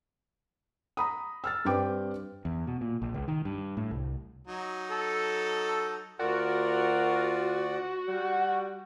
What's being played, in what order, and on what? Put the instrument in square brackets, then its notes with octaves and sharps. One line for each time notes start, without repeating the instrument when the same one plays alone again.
[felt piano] A#5 B5 D#6
E6 F6 A6
G2 C4 B4 D5 G5 D6
[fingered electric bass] E2
B2
A#2
A#1
C#2
D#3
G2
A2
C2
[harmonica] F#3 D#4
[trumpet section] A4
[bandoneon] D2 D5 [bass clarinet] F4 [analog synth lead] F#4 [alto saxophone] A#4
[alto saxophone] G3